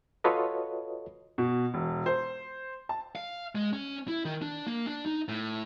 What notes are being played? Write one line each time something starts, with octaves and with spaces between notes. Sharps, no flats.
F4 F#4 A4 B4 C#5 D#5
B2
E1
C5
A5
F5
G#3
C#4
E4
D#3
D4
A#3
D4
D#4
A2